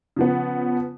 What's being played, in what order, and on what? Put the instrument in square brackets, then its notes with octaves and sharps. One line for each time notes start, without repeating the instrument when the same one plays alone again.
[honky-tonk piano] C#3 F3 B3